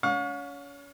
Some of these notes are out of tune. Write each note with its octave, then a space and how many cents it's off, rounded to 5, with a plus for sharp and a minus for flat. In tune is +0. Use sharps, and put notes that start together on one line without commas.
C#4 +30 F5 +45 C#6 +15